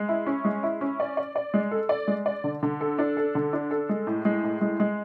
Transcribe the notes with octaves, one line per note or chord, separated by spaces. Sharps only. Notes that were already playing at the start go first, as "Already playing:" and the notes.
Already playing: G#3
E4
C#4
G#3
E4
C#4
D5
D5
D5
G#3
A4
D5
G#3
D5
D3
D3
A4
D4
A4
D3
D4
A4
G#3
A2
G#3
A2
G#3
G#3